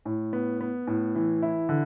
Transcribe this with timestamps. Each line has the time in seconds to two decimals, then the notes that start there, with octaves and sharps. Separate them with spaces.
0.05 A2
0.33 B3
0.61 B3
0.87 A2
1.15 E3
1.42 E4
1.69 D3